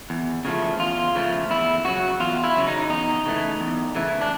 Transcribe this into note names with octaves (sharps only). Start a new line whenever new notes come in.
E2
C#3 F3 A3
E2 F4
C#3 F3 A3
E2 E4
C#3 F#3 F#4
E2 F4
E4
C#3 F#3
D#4
E2 D#4
C#3 E3 A3
E2
C#3 E3 A3
D4